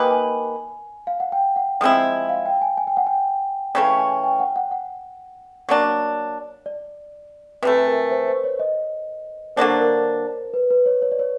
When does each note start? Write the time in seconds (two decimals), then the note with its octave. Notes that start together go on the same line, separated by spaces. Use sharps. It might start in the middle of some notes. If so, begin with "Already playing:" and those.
Already playing: A#3 D#4 G4 B4 G#5
0.11 G#5
1.07 F5
1.20 F#5
1.32 G5
1.56 F#5
1.81 F3 G#3 C4 E4
2.29 F5
2.46 G5
2.62 G#5
2.77 G#5
2.87 G5
2.97 F#5
3.07 G5
3.75 C#3 E3 A3 C#4 G5
3.99 G#5
4.24 G5
4.40 F#5
4.56 F#5
4.71 F#5
5.69 F#3 A#3 D4
6.66 D5
7.63 C3 E3 A3 B4
7.88 A#4
8.11 C5
8.28 C5
8.44 C#5
8.60 D#5
9.56 D3 F#3 A#3 D4 C5
9.81 A#4
10.54 B4
10.70 B4
10.86 C#5
11.02 C#5
11.12 D5
11.19 C#5